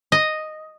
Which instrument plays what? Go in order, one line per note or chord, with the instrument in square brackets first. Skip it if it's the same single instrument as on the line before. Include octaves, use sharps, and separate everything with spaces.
[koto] D#5